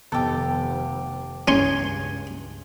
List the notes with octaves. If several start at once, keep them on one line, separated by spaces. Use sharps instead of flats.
F1 D#3 B3 G4 A4 E6
C#2 G2 C#4 G#4 C6